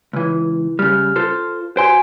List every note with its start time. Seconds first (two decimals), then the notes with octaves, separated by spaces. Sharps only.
0.13 C#2 E3
0.79 C#3 G3 F6
1.16 F4 A4 C5
1.77 F#4 C5 G#5 C6 D7